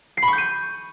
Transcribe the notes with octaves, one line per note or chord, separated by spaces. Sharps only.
C7
B5
C#6
G6
D#7